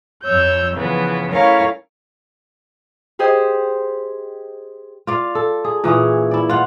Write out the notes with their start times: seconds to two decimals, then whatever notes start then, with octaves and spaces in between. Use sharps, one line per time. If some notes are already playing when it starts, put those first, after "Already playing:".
0.23 F2 F3 C#5 E6 G6
0.74 C#3 E3 F3 B3 B4
1.31 A3 C#4 E4 A#4 C#5 F5
3.19 G4 G#4 C5 D#5 G5
5.07 F4 D5 F5
5.35 A4
5.65 G#4
5.84 A#2 E3 C#4 G#4
6.31 E4 D5
6.49 F4 F#5